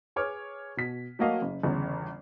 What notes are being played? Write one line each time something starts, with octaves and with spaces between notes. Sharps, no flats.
G#4 B4 C#5 D6 F6
B2 B6
F#3 A3 A#3 F#4 D#5 F5
F#1
G1 E2 C#3